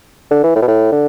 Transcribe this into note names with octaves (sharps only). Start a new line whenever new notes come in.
D3
E3
A2
B2
A2
D3